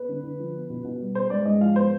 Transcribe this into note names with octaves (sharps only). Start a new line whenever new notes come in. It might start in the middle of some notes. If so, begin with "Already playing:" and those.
Already playing: B3 B4
D3
D3
F3
B3
B2
B2
G3
B3 C5
G#2 D5
G#2 D#5
F3 F5
B3 C5